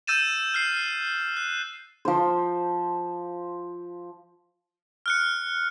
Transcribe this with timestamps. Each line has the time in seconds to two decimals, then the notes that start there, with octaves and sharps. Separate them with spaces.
0.07 E6 G6 A6 D#7 E7
0.54 F6 C7
1.37 F#6
2.05 F3 C5
5.06 F6 F#6 C#7